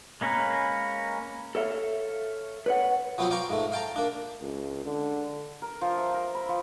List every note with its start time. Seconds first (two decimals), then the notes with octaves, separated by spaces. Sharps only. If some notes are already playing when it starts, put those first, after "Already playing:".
0.21 G#3 A#3 C#4 A#4 B4
1.55 A4 C#5 E5 F5
2.66 B4 C#5 F#5
3.18 F3 F#3 B3 C4 F4 C5
3.31 D5 F5 G5 A#5 C#6
3.50 G#2 A3
3.72 F5 G5 A5 A#5
3.96 A#3 D4
4.41 C#2
4.85 D3
5.62 A#4
5.81 F3
5.98 E5
6.14 A#4
6.35 B5
6.49 F3